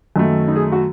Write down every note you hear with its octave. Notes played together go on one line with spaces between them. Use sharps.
F#2 D#3 F#3 A3
D#4
G#4
F#4